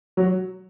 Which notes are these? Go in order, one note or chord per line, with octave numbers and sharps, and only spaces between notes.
F#3